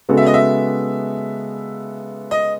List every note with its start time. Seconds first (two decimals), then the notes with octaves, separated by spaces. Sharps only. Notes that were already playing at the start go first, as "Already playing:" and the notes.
0.09 C#3 G#3 B3 F#4 A4
0.17 E5
0.26 D#5
0.34 E5
2.31 D#5